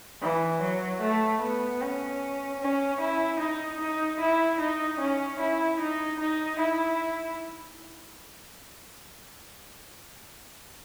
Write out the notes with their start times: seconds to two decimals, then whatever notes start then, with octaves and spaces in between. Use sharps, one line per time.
0.21 E3
0.62 F#3
1.01 A3
1.42 B3
1.81 C#4
2.61 C#4
3.01 E4
3.41 D#4
3.81 D#4
4.21 E4
4.60 D#4
5.00 C#4
5.40 E4
5.80 D#4
6.20 D#4
6.60 E4